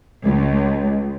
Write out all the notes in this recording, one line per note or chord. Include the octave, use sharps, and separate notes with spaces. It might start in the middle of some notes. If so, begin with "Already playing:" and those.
C#2